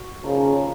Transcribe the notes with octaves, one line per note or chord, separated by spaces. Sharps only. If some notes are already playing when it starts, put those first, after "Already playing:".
Already playing: F#4
C#3 F3 A#3 D#4